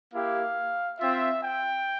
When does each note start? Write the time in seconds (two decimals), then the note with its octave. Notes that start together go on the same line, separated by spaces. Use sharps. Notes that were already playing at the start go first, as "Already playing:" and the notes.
0.14 A#3 E4 G4 F5
0.99 C4 F4 E5
1.43 G5